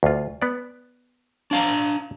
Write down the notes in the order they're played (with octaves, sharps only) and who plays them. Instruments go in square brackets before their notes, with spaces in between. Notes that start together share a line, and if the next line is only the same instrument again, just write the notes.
[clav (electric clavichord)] D2 F4
B3 D5
[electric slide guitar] D4 F5 A#5